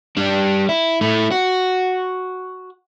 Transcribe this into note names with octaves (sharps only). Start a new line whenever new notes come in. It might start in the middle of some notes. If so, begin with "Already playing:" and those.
G3 D4
E4
A3 E4
F#4